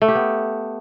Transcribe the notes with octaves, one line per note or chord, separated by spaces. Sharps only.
A3
G4
B3